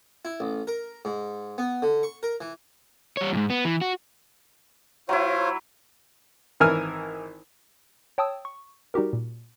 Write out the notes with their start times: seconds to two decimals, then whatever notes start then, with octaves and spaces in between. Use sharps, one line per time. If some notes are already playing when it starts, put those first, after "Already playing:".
0.25 E4
0.40 A1
0.67 A#4
1.05 G#2
1.58 B3
1.82 D3
2.03 C#6
2.23 A#4
2.41 E3
3.17 G3 C#5
3.33 F2 G#2
3.50 B3
3.65 E3
3.81 F#4
5.09 F#3 E4 F4 C5 C#5
6.60 G#1 E3 A#4 G#5 E6 F6
8.18 C#5 G5 A5 D#6 E6
8.45 C#6
8.94 G3 D#4 F#4 G4 A#4
9.13 A#2